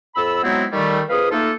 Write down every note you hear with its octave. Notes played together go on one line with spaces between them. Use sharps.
F2 A4 B5 E6
F#3 G#3 B3 C4 D#4 E4
D#3 G3 A3
F2 G#4 B4 F5 D#6
A3 A#3 D#4 F4 A4